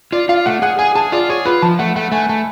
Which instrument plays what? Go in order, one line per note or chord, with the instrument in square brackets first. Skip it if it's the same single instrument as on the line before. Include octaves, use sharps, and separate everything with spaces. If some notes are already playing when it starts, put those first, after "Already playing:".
[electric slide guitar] F4 [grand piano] D5
[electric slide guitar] F4 [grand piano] F5
[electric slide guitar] A3 [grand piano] F#5
[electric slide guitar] G#4 [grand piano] F#5
[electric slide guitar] G#4 [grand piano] G#5
[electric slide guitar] G#4 [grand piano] A5
[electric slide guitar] F4 [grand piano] D5
[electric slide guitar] G#4 [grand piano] C#5
[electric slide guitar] F4 [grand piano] B4
[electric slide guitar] F3 [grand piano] A5
[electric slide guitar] A3 [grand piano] F#5
[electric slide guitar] A3 [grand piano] F#5
[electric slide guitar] A3 [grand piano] G#5
[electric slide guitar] A3 [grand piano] A5